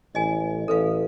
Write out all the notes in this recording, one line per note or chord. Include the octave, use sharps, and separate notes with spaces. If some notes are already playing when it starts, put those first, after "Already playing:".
A1 D#5 G#5
A1 A4 B4 F5